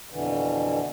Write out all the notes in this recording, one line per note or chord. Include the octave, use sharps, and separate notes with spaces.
F2 B2 D3 E3